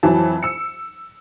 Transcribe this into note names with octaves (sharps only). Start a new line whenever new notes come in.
F2 E3 F#3 A5
E6 C#7